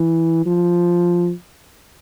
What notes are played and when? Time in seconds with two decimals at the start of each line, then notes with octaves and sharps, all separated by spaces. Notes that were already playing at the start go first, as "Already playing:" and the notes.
Already playing: E3
0.46 F3